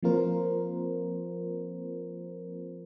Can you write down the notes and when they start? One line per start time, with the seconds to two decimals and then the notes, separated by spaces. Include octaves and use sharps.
0.03 F3 A#3 C4 F4 A#4 C5